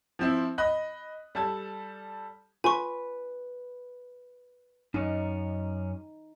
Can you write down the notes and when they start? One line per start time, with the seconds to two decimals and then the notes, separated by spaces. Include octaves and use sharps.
0.19 F3 C4 E4
0.58 D#5 B5 D#6 F#6
1.35 G3 A4 A5 G#6
2.64 F4 B4 G#5 C#6
4.94 F#2 C#4 D#4